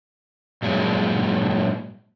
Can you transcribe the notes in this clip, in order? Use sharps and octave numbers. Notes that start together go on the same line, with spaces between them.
G2 A#2 F#3 G#3